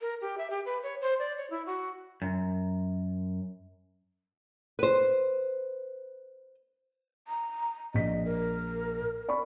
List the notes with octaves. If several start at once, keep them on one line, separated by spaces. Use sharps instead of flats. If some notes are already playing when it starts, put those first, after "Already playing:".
A#4
G4
E5
G4
B4
C#5
C5
D5
C#5
E4
F#4
F#2
B4 C5
A#5
A#1 D#5 B6
A#4
D5 B5 C#6